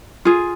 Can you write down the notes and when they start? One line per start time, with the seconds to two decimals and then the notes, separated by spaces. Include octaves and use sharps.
0.25 F4 G#4